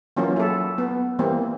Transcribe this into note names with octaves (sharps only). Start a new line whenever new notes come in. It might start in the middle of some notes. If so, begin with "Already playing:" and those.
E3 F#3 A#3 C#4 F4
E4 A4
B3
E3 G3 A#3 C4